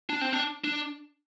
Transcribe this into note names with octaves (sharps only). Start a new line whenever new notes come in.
D4
C4
D4
D4